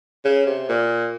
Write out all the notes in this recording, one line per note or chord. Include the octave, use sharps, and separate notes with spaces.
C#3
C3
A#2